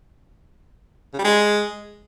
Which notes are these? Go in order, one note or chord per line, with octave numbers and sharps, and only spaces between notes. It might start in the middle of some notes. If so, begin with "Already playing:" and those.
C#3
G3
G#3